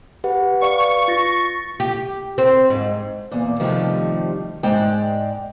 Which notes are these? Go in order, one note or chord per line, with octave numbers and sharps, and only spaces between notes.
G4 B4 F#5
B4 D5 F5 C#6
F4 A6 A#6
G4
C4
G#2
E2 A#2
C3 D#3 F3 G3 A3
G#2 G#3 D5 G5